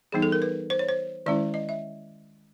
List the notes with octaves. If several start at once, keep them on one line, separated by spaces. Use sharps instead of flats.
E3 G3 B3 D#4 G#4
A4
A#4
B4
C5
C#5
C5
D#3 G#3 C#4 E4 D5
D#5
E5